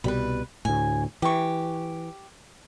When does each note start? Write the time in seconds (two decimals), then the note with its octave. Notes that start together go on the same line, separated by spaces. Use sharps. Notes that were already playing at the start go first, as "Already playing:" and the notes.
0.04 C2 B2 G3 B4 B5
0.65 D2 A2 G#5
1.22 E3 G4 C#6